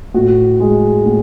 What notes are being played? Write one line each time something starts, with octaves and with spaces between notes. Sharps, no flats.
A2 F#4
G#3
A2